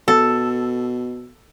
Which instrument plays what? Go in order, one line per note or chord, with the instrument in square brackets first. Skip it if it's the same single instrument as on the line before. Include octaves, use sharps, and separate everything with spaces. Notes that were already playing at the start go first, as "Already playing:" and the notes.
[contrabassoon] B2 [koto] A4